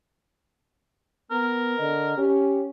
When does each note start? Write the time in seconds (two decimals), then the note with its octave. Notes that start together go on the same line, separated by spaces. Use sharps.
1.31 B3 A#4
1.78 D3 D#5
2.18 C#4 G4